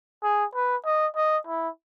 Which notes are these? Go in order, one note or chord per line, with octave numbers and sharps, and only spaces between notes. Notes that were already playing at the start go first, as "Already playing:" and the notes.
G#4
B4
D#5
D#5
E4